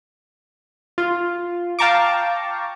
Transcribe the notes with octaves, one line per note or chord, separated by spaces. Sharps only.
F4
F5 G5 A5 A#5 C#6 D6